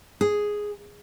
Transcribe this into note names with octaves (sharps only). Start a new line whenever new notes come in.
G#4